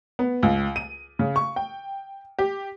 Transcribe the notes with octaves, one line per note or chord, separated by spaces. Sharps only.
B3
C#2
D#7
C#3
C#6
G5
G4